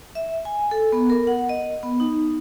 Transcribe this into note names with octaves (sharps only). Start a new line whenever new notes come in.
E5
G#5
A4
B3
A#4
F#5
D#5
B3
D#4